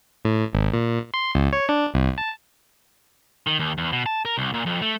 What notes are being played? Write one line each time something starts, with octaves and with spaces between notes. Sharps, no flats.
A2
G#1
A#2
C6
C#2
C#5
D4
C2
A5
D#3
D#2
E2
B2
A5
A#4
C2
A#2
F2
A3